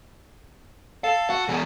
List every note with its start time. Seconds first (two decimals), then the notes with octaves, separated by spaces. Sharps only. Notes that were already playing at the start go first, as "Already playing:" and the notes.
1.04 A4 F5
1.30 F#4
1.48 E2 B2 G#4